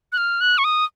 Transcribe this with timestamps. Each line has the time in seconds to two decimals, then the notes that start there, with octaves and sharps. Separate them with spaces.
0.12 F#6
0.17 F6
0.41 F#6
0.58 C#6
0.64 D#6